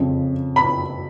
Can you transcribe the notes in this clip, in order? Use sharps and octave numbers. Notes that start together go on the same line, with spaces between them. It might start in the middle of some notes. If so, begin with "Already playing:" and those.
Already playing: F2 C#3 F3
B5